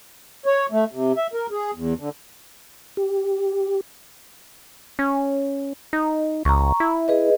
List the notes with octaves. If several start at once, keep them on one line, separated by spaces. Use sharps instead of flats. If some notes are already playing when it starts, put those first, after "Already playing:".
C#5
A3
C3
E5
A#4
G#4
E2
D3
G4
C#4
D#4
C#2 A#5 C#6
E4
G#4 B4 D#5